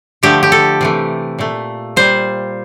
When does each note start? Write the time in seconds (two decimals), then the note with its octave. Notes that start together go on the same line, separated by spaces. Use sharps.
0.23 D3 F3 A3 G4
0.43 G4
0.52 A4
0.81 C3 E3 A3
1.39 A#2 A3
1.96 A#2 G3 C5